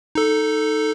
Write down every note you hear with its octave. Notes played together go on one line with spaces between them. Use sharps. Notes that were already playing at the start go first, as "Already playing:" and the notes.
D#4 A4